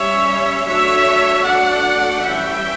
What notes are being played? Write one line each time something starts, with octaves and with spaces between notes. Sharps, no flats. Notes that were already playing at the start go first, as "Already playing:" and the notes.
Already playing: G3 C#4 C#5 E5
F#3 A3 D4 C#5 E5
F#3 A3 D4 D5 F#5
E3 G3 C#4 E5 G5